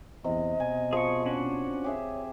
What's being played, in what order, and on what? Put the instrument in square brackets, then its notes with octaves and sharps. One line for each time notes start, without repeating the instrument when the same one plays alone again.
[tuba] E2 [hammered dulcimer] C3 [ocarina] D#5
[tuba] B2 [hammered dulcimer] G#5
[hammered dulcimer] F3 [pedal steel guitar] G#4 C#6
[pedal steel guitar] C#4 D4 F#4
[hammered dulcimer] G4 G#4 E5 [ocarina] C#5